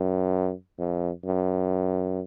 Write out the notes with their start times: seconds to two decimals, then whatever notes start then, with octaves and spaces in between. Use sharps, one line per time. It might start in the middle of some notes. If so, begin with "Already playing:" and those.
Already playing: F#2
0.79 F2
1.25 F#2